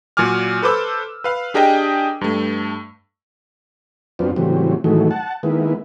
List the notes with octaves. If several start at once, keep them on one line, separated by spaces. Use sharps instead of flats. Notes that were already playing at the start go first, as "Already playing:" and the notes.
A#2 F#3 G#5 D6 F6
A4 B4 C5 D6 E6
B4 F5
D4 G4 G#4 A#4 D#5 G5
G2 A3
F#2 B3 C4 D4 F4
A2 C#3 E3 F#3 G3 C4
A2 D#3 E3 F#3 G#3 A3
F#5 A5
D#3 G#3 A#3 B3 E4